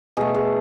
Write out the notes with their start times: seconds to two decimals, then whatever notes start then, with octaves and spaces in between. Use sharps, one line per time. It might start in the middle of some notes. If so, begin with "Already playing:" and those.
0.17 B2 A3 G#4
0.34 G#4